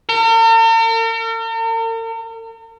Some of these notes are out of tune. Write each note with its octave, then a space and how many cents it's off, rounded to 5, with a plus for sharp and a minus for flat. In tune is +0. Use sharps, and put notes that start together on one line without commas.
A#4 -45